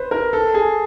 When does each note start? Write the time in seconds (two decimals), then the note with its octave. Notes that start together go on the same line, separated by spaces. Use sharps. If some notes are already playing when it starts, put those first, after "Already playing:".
Already playing: B4 C5
0.11 A#4
0.33 A4
0.54 G#4